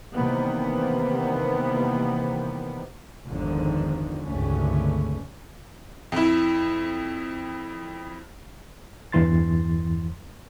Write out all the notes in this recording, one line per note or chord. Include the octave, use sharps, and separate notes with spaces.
C3 D#3 E3 G3 A#3 B3
G1 E2 G#2 D3 D#3 F3
G#1 C#2 G2 D3 A3 C#4
F2 E4
E2 G2 E3 C6 A6